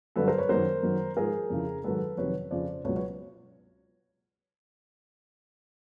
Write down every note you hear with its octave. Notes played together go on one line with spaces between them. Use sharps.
G2 D3 F#3 A4 B4
A#4 C5
B4 C#5
F#2 D#3 F#3 A#4 C5
F#2 D#3 F#3
G#2 F3 G#4 A#4
F2 C#3 E3
G#2 D#3 F#3 A4 B4
F2 C3 D#3 F#3 B4 C#5
F2 C#3 F3 C5 D5
C#2 B2 F#3 B4 C#5
B4 C#5